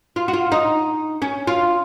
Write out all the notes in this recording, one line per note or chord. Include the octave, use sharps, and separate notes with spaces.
F4
F#4
F4
D#4
C#4
F4